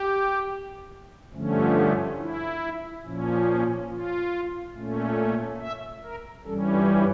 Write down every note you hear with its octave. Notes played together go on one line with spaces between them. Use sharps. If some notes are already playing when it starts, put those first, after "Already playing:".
Already playing: G4
G2 D3 F3 A3 C#4
E4
A#2 F3 C#4
F4
A#2 A3 C#4
E5
A#4
G2 E3 G3 C#4 A4
F4